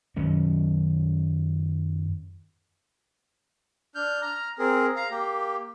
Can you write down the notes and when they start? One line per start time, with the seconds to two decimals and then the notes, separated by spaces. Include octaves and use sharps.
0.16 F#2 D#3 F#3 C#4
3.95 D4 F6 G6
4.22 A#5 F6
4.59 C4 G#4 A#4
4.96 F5 A#5
5.11 A#3 G4